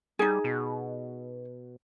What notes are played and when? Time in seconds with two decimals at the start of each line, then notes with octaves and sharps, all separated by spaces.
0.19 G3 D#4 G#4
0.44 B2